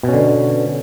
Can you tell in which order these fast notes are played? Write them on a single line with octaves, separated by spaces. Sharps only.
B2 C#4 D3